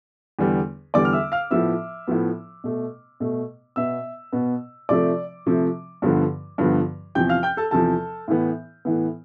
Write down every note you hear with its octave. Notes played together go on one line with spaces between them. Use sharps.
E2 D3 G3 B3
E2 D3 G3 B3 D5 D6
F6
E5 E6
F5 F6
A2 F3 B3 E5 E6
A2 F3 B3
B2 A3
B2 A3
B2 B3 E5 E6
B2 B3
C3 F3 A3 D5 D6
C3 F3 A3
G2 D3 F3 B3
G2 D3 F3 B3
E2 C3 F3 G5 G6
F5 F6
G5 G6
A4 A5
E2 C3 F3 A4 A5
A2 E3 B3
A2 E3 B3